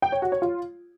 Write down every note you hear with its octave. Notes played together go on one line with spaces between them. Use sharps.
G5
C#5
F#4
C#5
F4